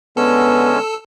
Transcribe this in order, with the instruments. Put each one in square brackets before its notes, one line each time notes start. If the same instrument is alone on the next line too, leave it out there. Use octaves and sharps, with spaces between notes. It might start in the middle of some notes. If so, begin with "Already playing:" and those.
[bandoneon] D3 G#3 C#4 [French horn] B3 [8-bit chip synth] A4 E6